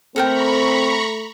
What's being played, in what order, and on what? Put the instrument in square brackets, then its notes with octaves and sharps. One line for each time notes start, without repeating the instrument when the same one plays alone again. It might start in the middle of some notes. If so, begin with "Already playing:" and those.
[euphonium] A3 [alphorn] C4 [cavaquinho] A4 A#4 G5 [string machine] A#5 B5 C#6